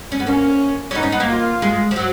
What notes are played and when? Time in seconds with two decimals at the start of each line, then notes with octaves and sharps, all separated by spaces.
0.12 C#4
0.20 B3
0.27 A#3 C#4
0.91 C#4
0.94 B3 D#4
1.03 C#4
1.12 B3
1.20 A#3
1.29 F4
1.62 G#3
1.91 F3
1.96 F#3